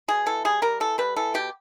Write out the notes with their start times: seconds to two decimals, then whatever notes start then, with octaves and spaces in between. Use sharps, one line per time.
0.08 B2 G#4
0.26 E3 A4
0.45 G3 G#4
0.62 G3 A#4
0.80 E3 A4
0.98 G3 B4
1.16 E3 A4
1.34 B2 G4